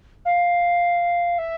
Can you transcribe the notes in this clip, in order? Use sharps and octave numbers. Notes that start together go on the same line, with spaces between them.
F5
E5